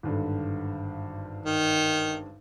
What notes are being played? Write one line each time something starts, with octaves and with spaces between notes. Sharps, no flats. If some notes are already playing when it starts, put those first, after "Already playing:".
G#1 G2 D3
D#3